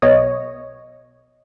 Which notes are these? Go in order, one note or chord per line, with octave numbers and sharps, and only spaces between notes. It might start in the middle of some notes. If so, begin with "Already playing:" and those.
B1 B2 C#5 D#5